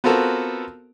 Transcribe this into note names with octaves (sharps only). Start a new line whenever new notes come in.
B3 C4 F4 F#4 A4 A#4